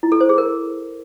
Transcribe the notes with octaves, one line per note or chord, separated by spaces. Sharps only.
E4
A4
C5
G#4
A#4